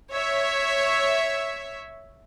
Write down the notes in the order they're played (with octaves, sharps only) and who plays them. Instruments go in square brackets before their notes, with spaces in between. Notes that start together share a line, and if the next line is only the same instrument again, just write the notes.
[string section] C#5 E5